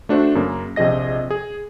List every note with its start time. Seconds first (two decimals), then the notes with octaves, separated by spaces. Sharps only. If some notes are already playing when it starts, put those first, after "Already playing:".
0.09 A3 D4 F#4 C5
0.35 F#2 C#3 A#3
0.76 A#1 C3 F3 G#4 D#5 A#6
1.31 G#4